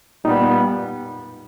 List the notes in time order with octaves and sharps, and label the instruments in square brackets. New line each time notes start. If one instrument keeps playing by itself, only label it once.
[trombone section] A#2 G3 B3 [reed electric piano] D#4